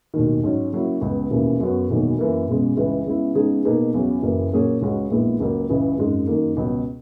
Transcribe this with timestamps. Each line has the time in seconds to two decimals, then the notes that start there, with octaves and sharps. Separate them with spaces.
0.14 E1 D#2 D#3
0.43 G#2 F#3 C#4
0.73 C#3 F#3 A#3 E4
1.01 C#2 C#3 G#3 B3
1.31 E1 D#2 C#3 E3 A#3
1.60 F#2 C#3 F#3 B3 F#4
1.89 E1 E2 D#3 F#3 A#3
2.19 F#2 E3 A#3
2.48 E1 E2 C#3 G#3
2.77 C#2 C#3 E3 G#3
3.06 C#3 G#3 B3 E4
3.35 C#3 G#3 B3 D#4 G#4
3.65 B2 A#3 D#4 G#4 B4
3.94 E2 C#3 F#3
4.23 F#1 F#2 E3 A#3
4.52 A#2 F#3 A#3 C#4 G#4
4.81 C#2 C#3 G#3 C#4 F#4
5.10 A#1 A#2 G#3 B3 E4
5.40 C#2 C#3 F#3 A#3
5.69 C#2 C#3 E3
5.98 G#1 F#2 C#3 G#3 D#4
6.27 F#2 D#3 A#3
6.57 C#2 B2 F#3